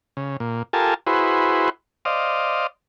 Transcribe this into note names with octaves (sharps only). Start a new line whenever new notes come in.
C#3
A#2
F4 G4 A4 A#4 G#5 A5
E4 F#4 G#4 B4 C5
C5 D5 D#5 F5